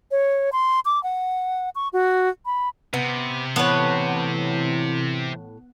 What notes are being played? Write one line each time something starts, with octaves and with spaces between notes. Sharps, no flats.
C#5
C6
D6
F#5
C#6
F#4
B5
C3 B3
A2 E3 B3 C#5